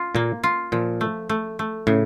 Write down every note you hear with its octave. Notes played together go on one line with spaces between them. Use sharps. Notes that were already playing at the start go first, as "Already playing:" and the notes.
Already playing: F4
A#2 A#3
F4
A#2 F3
A3
A3
A3
A2 C#3